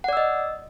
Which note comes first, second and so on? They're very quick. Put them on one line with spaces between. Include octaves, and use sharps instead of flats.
F#5 D5 E6 D#5